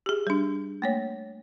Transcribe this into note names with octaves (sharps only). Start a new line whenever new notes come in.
G4 G#4
G3 D4
A3 A#3 C#5